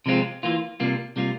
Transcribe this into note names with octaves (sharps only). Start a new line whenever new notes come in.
C3 F3 G#3 C4 F4
E3 A#3 F4
C3 G3 A#3 F4
C3 G3 A#3 F4